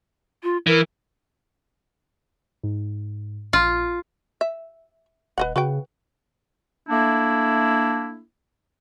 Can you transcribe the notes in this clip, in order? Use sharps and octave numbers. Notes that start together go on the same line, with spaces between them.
F4
E3 A#4
G#2
A#1 F4
E5
D#1 B4 D#5 F#5
C#3 F#4 B4 G5
A3 A#3 D4 E4